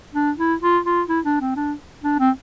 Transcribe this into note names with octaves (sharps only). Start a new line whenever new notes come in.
D4
E4
F4
F4
E4
D4
C4
D4
D4
C4